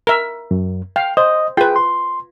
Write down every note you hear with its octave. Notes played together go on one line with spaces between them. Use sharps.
A#4 E5
F#2
F5 G5
C5 D#5 D#6
F4 G#4 B4 G5
C6